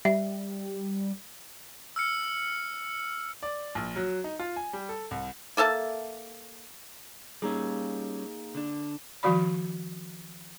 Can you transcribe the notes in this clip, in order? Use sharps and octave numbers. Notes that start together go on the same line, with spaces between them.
G3 E5
E6 F6 C#7
D5
A#1
F#3
D#4
F4
G#5
G3
A4
C2
A#3 A4 E5 A5
G3 A#3 C#4 D#4 G#4
D3 D4
D#3 F3 G3 F#4 D5 B5